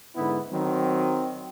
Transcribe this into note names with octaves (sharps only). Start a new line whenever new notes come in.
G#2 D3 B3 E4
D#3 F#3 C4